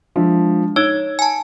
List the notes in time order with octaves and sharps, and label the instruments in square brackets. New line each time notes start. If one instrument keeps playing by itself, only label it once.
[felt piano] F3 [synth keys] G#3 D4 E5
[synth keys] D#4 [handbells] C#5 [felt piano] E6 G#6
[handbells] G#5 A5